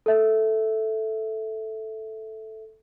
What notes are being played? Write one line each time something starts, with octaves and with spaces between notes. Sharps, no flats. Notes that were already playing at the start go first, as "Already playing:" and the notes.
A4 E5